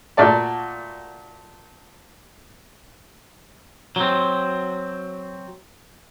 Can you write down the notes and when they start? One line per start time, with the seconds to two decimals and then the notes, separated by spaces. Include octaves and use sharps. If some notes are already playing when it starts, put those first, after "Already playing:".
0.17 A#2 A3 F#4 D5 A5
3.96 F#3 C4